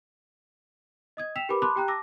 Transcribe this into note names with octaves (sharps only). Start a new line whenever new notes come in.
D#5 D#6 G#6
G5 E6 B6 E7 F7
G4 A#4 B4 G#5 B5 D6
A5 B5 C6 D6 D#6 F#6
G4 G5 A#5 F#6
A5 D6 E6 A#6